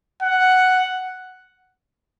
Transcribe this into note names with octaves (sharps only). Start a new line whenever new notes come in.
F#5